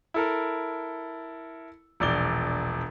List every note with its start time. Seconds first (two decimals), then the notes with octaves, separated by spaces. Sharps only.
0.14 E4 A4 A#4
2.00 E1 A#1 D5 G7